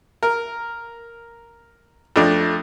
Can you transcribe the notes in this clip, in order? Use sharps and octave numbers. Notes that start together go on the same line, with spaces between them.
A#4
F2 A3 D4